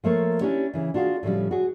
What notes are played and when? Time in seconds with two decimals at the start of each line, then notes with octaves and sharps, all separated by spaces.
0.04 F3 A3 A#3 C#5
0.41 C#4 D4 E4 G4 C#5
0.74 C#3 E3
0.94 D4 F4 F#4 G#4 F5
1.23 A2 C#3 F3 G3
1.51 F#4 G#4